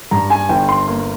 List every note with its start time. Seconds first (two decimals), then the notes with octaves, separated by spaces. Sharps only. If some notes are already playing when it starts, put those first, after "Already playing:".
0.11 G2 A#5
0.30 G#5
0.49 G1 G5
0.69 C6
0.88 A#3